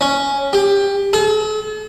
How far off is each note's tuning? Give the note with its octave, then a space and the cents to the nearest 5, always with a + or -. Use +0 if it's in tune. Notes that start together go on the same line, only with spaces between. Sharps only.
C#4 +5
G4 +20
A4 -45